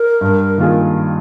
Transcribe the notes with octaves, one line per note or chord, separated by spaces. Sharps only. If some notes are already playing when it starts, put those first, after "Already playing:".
Already playing: A#4
G2
D#3 A#3 F4 G#4